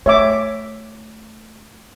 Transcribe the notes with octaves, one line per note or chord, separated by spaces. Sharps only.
A3 C#5 E5 D6